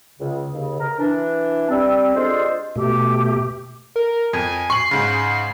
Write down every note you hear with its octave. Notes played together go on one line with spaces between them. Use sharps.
C#2 C#3
D#2 C#3
A#4
E3 D4
G3 C4
C3 G#3 D4 F4 A4 C5
B2 A3 G4
A#4
F2 G#5
C#6 C7 F#7
G#2 C#3